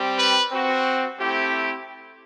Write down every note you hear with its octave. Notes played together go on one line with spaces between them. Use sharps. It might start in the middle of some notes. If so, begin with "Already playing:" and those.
Already playing: G3 C4 G4
B4
C4 F#4
A3 C4 E4 G4